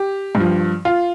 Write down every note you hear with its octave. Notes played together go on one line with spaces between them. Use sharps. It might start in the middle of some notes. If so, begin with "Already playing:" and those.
Already playing: G4
G2
F3
F4